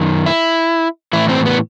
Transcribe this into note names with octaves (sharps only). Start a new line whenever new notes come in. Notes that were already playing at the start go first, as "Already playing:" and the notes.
Already playing: F#2 D#3
E4
A2 E3 E4
C4
B3